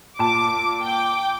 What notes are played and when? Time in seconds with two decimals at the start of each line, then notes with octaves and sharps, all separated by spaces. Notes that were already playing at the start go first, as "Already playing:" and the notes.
0.19 A#2 A5 D6
0.83 G5 D6